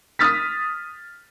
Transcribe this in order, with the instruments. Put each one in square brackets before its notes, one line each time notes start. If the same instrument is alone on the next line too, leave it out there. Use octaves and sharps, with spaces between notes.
[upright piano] D#6 F6 A6 B6